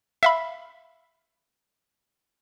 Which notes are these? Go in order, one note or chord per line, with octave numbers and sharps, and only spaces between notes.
E5 F5 B5